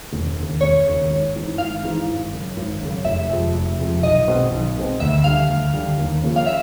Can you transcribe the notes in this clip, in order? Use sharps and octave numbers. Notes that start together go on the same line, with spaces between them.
E1
D#2 C#3
E1 C#5
D#2 C#3
G#1
G#2 E3 G#3
G#1 F5
G#2 E3 G#3
G#1
F#2 C#3
G#1
F#2 C#3
F1 E5
F2 C3 F3 G#3
F1
F2 C3 F3 G#3
B1 D#5
B2 G#3 C4
B1
B2 G#3 C4
D2 E5
D3 G3 F5
D2
D3 G3
D#2
C#3 F3 A#3 C#4
F5
E5